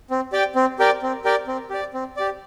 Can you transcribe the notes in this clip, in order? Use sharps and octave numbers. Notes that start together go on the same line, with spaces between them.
C4
G4 D5 G5
C4
G4 A#4 D5 G5
C4
G4 A#4 D5 G5
C4
G4 D5
C4
G4 D5